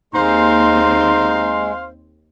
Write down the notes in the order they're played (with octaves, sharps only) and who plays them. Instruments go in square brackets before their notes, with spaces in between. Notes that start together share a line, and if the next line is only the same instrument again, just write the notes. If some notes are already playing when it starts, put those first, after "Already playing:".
[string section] D#2 C4 [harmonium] G#3 [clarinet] D#4 [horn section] C5 F5 C6